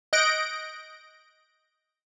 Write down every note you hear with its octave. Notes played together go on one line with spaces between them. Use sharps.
D#5 F#6 G6 A#6 C#7 D7